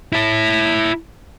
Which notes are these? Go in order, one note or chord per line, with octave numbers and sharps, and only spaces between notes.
E4 A5